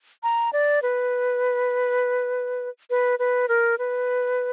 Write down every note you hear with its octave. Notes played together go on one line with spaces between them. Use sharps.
A#5
D5
B4
B4
B4
A#4
B4